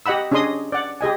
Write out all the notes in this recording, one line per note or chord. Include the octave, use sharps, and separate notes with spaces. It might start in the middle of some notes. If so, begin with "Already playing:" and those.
G4 D#5 F#5 B5 E6
C#4 D4 G#4 D#5 C6 D#6
D5 F#5
G4 G#4 D#5 G#5